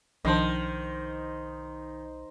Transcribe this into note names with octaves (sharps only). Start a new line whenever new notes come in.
B1 D#3 F3 D4 C5 D#5 A5